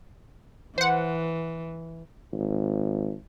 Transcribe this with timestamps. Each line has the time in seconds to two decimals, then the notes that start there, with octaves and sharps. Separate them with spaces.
0.78 E3 C5 F#5
2.32 G#1